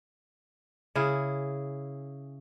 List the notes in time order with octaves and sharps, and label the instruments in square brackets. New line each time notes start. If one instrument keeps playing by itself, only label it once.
[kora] C#3 E4 G#4